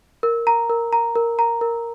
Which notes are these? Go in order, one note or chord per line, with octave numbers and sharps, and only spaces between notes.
A#4
A#5
A#4
A#5
A#4
A#5
A#4